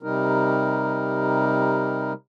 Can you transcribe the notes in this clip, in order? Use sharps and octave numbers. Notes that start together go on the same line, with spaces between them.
C3 G3 D#4 A#4